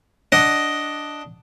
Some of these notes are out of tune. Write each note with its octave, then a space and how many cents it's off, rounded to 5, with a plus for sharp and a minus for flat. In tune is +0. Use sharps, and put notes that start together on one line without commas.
D4 +0 D#5 +5 F#5 +0